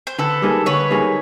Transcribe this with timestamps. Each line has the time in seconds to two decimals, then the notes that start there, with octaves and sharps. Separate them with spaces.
0.07 C5
0.19 D3 A4 B4
0.42 G3 A#3 D#4 G#4
0.66 D3 B4 C#5
0.90 G3 A#3 D#4 G#4